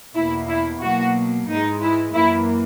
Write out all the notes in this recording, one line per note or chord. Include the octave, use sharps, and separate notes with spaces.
E2 B2 A#3 E4
E4
B2 F#3 A#3 F#4
G#2 E3 G#3 D#4
E4
F#2 E3 A#3 E4